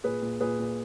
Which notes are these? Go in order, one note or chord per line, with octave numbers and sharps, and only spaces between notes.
A#2 G#4 B4
A#2
A#2 G#4 B4
A#2